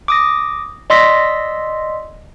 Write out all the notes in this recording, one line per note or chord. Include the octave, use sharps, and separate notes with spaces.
D6 D#6 A#6
D5 D#5 C6 E6 A#6 B6